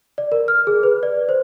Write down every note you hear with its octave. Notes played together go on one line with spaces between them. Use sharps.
D5
A#4
F6
G#4
B4
D5
C5